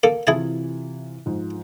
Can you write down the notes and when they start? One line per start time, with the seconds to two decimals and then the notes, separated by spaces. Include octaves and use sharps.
0.03 A#3 A4
0.27 C3 E3 E4 F4 G#4 A5
1.26 G#2 F3